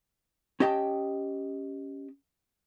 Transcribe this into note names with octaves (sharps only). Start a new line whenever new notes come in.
C#4 G4 D#5 G5 A5